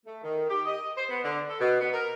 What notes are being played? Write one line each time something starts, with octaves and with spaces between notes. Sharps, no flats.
A3
D#3
G4
D#5
C5
B3
D3
A4
B2
B3
A#4